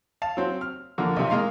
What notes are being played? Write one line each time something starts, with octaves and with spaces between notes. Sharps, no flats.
F5 A5
F#3 C4
F6
F2 D3 A#3
B1 C3
G#3 A#3 F5 C6